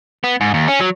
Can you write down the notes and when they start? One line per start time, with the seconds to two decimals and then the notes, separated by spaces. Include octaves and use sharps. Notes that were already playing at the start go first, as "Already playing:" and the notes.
0.24 B3
0.41 G#2
0.54 D#2
0.68 C#4
0.80 F#3